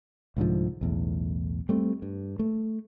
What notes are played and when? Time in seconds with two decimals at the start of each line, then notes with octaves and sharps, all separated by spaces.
0.37 C2 G#2 D3 F3
0.81 B1 E2 A2
1.69 G3 A3 C4
2.02 G2
2.39 A3